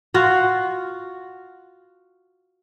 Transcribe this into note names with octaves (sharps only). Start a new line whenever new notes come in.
F4 F#4